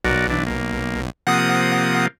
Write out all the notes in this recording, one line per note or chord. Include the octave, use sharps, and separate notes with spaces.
B1 F#4 A#4 D5
E3 D4
A#3
C3 F3 A#3 F#5 D#6